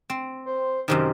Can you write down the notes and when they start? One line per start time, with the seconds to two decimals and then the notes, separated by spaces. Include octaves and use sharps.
0.10 C4
0.46 C5
0.88 F#2 C3 D#3 C5